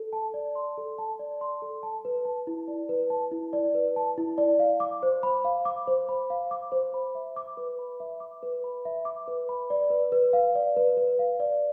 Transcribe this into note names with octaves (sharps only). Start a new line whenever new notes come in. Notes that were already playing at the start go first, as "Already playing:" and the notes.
Already playing: A4
A5
D5
C6
A4
A5
D5
C6
A4
A5
B4
A5
E4
D5
B4
A5
E4
D5
B4
A5
E4
D5
F5
D6
C5
B5
F5
D6
C5
B5
F5
D6
C5
B5
E5
D6
B4
B5
E5
D6
B4
B5
E5
D6
B4
B5
D5
B4
B4
F5
D5
B4
B4
F5
D5